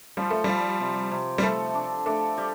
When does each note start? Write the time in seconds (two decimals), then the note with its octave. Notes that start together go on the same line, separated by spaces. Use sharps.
0.17 F3 G3
0.31 A3
0.44 F3 G3
0.80 C3
1.11 C3
1.38 G3
1.43 A3 A4
1.75 D4
2.06 A3 D4
2.38 G3